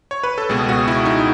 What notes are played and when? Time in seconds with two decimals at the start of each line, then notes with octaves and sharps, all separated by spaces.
0.11 C#5
0.24 B4
0.38 A4
0.49 C#2 B2 G#4
0.69 F#4
0.88 E4
1.05 D#4